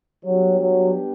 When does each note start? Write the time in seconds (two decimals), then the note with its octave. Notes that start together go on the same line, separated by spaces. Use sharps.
0.25 F#3 G3 B3 D4 G4
0.59 F#3